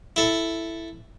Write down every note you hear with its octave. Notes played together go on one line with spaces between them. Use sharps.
E4 A4